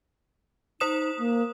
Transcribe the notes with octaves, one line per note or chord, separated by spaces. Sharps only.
D#4 C5 D#6 E7
A#3